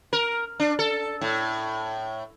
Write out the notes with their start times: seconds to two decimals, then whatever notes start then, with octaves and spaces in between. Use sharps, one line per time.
0.13 A#4
0.60 D4
0.79 A4
1.21 A2